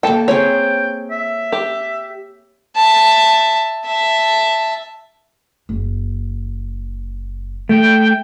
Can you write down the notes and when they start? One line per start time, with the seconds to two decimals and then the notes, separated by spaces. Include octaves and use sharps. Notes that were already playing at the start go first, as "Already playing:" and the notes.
0.03 A#3 A4 G5 A5
0.28 C4 C#4 G#4 C#5 G5
1.11 E5
1.52 G4
2.76 E5 A5
3.86 E5 A5
5.69 F#1
7.69 A3 G5